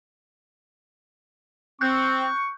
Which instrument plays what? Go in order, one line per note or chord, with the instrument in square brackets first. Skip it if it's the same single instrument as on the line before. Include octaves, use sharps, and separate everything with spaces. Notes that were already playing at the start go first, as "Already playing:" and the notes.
[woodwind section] C4 [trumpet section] C#6 [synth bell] F#6 G6